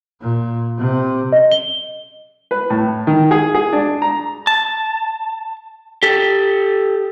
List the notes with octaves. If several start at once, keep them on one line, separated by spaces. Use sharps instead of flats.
A#2
C3
D#5
G7
B4
A2
D#3
G#4
G#4
D4
A#5
A5
G4 A4